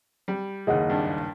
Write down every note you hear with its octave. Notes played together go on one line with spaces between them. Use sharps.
G3
F#1 D#2 G#4 D#5 F#5
G2 D4